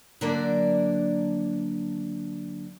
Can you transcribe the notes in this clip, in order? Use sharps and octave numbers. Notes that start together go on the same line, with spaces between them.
D3 F#3 A#3 D4 A#4 D5